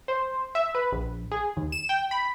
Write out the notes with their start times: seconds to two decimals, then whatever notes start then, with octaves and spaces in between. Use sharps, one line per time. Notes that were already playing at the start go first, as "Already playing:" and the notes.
0.08 C5
0.55 E5
0.75 B4
0.92 A#1
1.31 G#4
1.57 D#2
1.72 E7
1.89 G5
2.11 B5